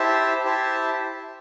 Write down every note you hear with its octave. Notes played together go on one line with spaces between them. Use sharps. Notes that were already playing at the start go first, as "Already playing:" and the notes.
Already playing: E4 G4 C5 E5 A5
E4 G4 C5 E5 A5